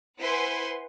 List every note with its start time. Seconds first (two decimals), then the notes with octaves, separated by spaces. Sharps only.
0.21 E4 B4 C5 F#5 G#5 C6